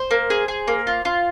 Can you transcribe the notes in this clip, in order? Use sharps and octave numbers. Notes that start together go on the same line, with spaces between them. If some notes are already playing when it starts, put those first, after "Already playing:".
Already playing: C5
A#3
G#4
G#4
A#3
F4
F4